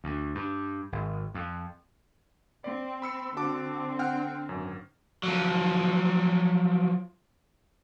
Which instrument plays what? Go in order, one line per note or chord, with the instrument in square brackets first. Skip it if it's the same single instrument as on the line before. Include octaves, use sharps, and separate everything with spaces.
[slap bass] D2
G2
G#1
F2
[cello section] C4 [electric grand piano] D5
[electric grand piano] B5 E6 C#7
[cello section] D3 C4 [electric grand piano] F#4 A5 D6
[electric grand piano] F#5 G5 F6
G#1 F#2
[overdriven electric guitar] F3 F#3